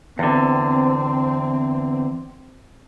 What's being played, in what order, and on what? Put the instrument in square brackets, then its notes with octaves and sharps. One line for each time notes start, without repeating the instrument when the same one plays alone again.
[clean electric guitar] E2 D3 [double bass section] C4